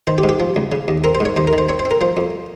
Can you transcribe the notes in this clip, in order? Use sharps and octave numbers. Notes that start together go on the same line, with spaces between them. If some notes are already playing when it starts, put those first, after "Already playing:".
D#3 C5
G4
G#2
G4
F3
C#2
C#3
D#2
C4 A#4
C5
G#2 C#5
D#2 C5
A#4
D#3
C5
C4 C#5
C5
C4
A#4
F3 C5
F2